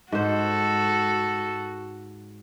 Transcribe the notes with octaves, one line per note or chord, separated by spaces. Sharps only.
G#2 F#4 A4 C5